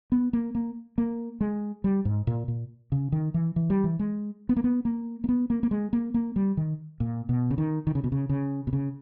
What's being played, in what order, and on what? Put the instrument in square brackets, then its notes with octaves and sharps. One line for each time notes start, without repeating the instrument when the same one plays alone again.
[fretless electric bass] B3
A#3
A#3
A#3
G#3
G3
G#2
A#2
A#2
C#3
D#3
E3
E3
G3
E3
G#3
B3
A#3
B3
A#3
A#3
B3
A#3
A#3
G#3
A#3
A#3
G3
D#3
A#2
B2
C#3
D#3
D#3
C#3
B2
C#3
C#3
B2
C#3